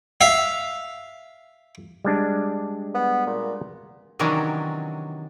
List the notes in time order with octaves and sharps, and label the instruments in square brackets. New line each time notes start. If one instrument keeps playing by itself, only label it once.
[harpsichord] E5 F5
[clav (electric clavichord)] G3 G#3 D4
[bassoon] B3
A#2
[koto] C3 D#3 E3 F#3 C#4 D4